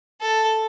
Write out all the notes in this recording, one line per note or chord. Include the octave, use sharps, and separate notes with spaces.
A4